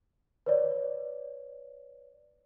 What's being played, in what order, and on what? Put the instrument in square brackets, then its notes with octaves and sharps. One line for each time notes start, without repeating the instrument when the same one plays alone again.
[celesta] B4 C#5 D5